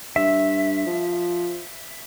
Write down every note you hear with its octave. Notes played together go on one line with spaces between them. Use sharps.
G2 E5
F3